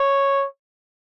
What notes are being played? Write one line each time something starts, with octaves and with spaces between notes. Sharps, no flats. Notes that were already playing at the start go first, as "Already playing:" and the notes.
Already playing: C#5